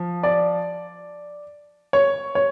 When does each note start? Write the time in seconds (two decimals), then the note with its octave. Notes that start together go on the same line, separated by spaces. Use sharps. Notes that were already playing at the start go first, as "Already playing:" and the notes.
Already playing: F3
0.23 D5
1.93 C#5
2.35 C#5